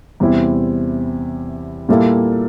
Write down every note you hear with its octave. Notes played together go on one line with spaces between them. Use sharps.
E2 C3 G3 C4 E4
A#2 G3 A#3 E4 A4